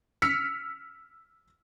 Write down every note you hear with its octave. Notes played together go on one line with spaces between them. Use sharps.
E6 F6 B6 C#7